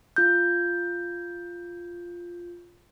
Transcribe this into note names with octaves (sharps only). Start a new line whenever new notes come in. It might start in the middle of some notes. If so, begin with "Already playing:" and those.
F4 G6